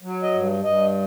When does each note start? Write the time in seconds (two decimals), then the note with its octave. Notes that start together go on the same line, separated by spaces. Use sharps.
0.02 F#3
0.23 D#5
0.33 G2
0.64 G2 D#5